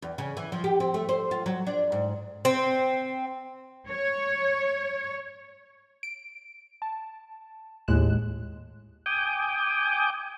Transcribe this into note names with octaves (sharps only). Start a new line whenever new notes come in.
E2
C#3
E3
F3
G4
C4
A3
C5
F4
F#3
D4
G#2
C4
C#5
D7
A5
G#1 D#2 A2 G#3 F#6 E7
G5 G#5 D6 D#6 G6